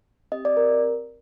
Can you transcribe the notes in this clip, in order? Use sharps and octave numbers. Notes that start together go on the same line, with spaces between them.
C4 G4 D#5
D5
A#4